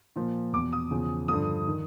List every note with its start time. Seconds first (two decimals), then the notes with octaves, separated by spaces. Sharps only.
0.16 A#2 F3
0.53 E2 B2 D6
0.73 D#6
0.91 E2 C#3 F3
1.28 G2 D3 F3 D#6
1.67 D#3